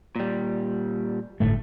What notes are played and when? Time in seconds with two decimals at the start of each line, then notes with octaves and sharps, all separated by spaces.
0.16 A#2 G3
1.40 G1 A2 A3